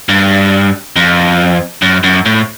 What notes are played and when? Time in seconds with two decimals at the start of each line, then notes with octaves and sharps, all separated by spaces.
0.09 G2
0.96 F2
1.82 F#2
2.04 F#2
2.26 A2